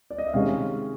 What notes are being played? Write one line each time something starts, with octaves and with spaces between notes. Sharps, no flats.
D5
D#5
E5
C3 D#3 G#3 C#4 F5